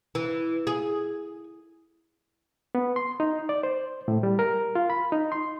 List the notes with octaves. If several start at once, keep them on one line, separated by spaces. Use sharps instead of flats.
E3
G#4
B3
C6
D#4
D5
C5
A2
G3
A#4
F4
B5
D#4
C6